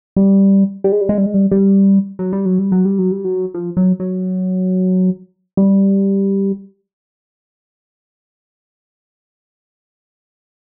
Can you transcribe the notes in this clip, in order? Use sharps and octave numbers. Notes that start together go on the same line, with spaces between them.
G3
G3
G#3
G3
G#3
G3
G#3
G3
G3
F#3
G3
F#3
G3
F#3
G3
F#3
G3
F#3
F3
F#3
F#3
G3